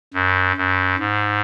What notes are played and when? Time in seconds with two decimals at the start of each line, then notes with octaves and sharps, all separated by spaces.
0.14 F#2
0.57 F#2
0.99 G#2